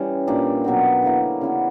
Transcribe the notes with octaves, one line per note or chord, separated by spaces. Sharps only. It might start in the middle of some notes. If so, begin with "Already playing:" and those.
Already playing: E3 G3 C#4
A#2 A#3 D4 G4
B2 F#3 B3 F#4
D3 A#3 E4
C#3 E3 B3 F#4